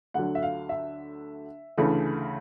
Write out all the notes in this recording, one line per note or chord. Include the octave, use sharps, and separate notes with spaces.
D2 D3 F#3 F#5
E5
F5
E5
D2 C#3 E3 A3